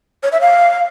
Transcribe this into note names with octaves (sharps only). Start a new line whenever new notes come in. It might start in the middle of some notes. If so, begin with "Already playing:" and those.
C#5
E5
F5